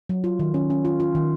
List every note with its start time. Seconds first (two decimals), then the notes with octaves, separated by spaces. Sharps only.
0.09 F#3
0.24 F4
0.39 D#3
0.54 C#4
0.70 C#4
0.85 F4
1.00 F4
1.15 D#3